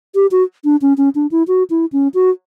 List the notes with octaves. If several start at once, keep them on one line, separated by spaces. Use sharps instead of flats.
G4
F#4
D4
C#4
C#4
D4
E4
F#4
E4
C#4
F#4